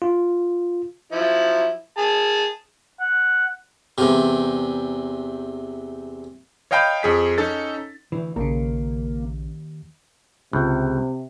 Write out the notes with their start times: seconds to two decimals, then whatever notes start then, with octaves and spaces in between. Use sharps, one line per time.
0.02 F4
1.12 F3 F#3 E4
1.98 G#4 A5
3.00 F#5
3.98 E2 C3
6.71 C#5 D#5 F5 G5 A5 B5
7.03 F2 G#4 B6
7.38 C#4 D#4 A4 A6
8.12 D2 E3
8.36 A#1 D#2 C#3 A#3
10.53 C#2 C3